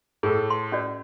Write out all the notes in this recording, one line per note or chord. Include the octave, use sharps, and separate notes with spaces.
A2 G#4 A4
C6
C#4 F#4 D5